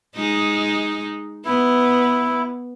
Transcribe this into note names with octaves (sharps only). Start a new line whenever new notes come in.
G#3 D#4
B3 E4